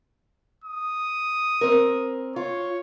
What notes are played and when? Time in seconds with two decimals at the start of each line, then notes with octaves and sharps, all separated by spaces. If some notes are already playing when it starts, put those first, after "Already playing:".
0.64 D#6
1.61 C4 A#4
2.36 F4 C#5